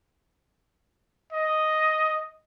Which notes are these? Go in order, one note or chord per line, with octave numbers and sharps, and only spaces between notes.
D#5